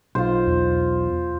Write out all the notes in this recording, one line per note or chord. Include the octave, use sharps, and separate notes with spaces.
B1 F4 C5
E2